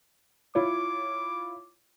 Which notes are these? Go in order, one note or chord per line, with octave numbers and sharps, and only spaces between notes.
E4 F4 C#5 D6